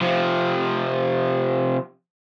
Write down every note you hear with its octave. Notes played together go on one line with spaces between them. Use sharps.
C3 F3